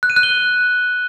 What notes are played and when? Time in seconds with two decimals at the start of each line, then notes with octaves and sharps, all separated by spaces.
0.03 F#6
0.10 D#7
0.16 F#6
0.23 G7